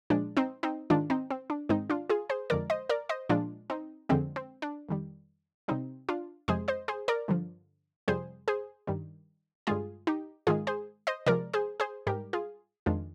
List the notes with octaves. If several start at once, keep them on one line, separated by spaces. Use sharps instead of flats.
A#2 F3 G#3 D4
C4 D#4
C4 D#4
G#2 D#3 G#3 D4 F4
C4 D#4
C4
D4
G#2 D#3 G#3 C4 D#4
D4 F4
F4 G#4
G#4 C5
F2 D3 G#3 A#4 D5
C5 D#5
A#4 D5
C5 D#5
A#2 F3 G#3 D4 F4
C4 D#4
F2 D3 F3 G#3 C4
C4
D4
F2 D#3 G3
C3 G3 C4 D#4
D4 F4
F2 C3 F3 G#3 G#4 C5
C5 D#5
G#4 C5
A#4 D5
G2 D3 F3
F2 C3 G3 G#4 C5
G#4 C5
G2 D#3 G3
G2 D3 G#3 F4 G#4
D#4 G4
G#2 D#3 G#3 F4 G#4
G#4 C5
C5 D#5
C3 F3 G#3 A#4 D5
G#4 C5
G#4 C5
G#2 G3 G4 A#4
F4 G#4
F2 D#3 G#3 D4 F4